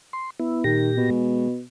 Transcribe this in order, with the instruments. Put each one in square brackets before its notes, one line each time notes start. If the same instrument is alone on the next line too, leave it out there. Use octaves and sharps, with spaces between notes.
[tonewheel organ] C6
B3 E4
[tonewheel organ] A#2 G4 A#6 [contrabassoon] D#3
[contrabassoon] B2
[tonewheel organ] G#3